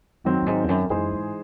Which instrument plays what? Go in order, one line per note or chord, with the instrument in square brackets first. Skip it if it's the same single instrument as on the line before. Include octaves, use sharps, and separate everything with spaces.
[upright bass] F#2 [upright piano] D#3 F#3 C4
[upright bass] F#2
G#2
E2
F#2
[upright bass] F#2 [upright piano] E3 G#3 D#4 G#4 C5
[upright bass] G#2